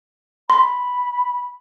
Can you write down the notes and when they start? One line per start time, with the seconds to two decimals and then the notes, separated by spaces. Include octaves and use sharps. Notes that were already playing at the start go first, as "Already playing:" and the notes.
0.50 B5 C6